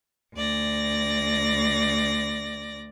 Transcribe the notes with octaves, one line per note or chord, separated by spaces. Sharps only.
D2 D5 A#6